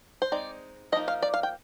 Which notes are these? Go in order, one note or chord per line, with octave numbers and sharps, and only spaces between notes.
C5
G#3 C4 D#4 D5
F3 A#3 D#4 D#5
F5
D5
F5
G5